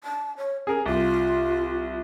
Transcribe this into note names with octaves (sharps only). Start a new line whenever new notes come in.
A5
C#5
C#4 G#4 A#4
C2 F4